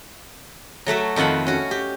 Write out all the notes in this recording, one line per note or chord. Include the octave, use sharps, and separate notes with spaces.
F#3 A3 F#4 E5
F2 D#3 F4 F#5 B5
C#4 F#4
G4